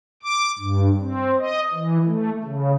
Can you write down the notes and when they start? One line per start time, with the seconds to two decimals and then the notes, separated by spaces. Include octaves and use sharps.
0.22 D6
0.59 G2
1.01 C4
1.39 D#5
1.73 E3
2.06 A3
2.44 C#3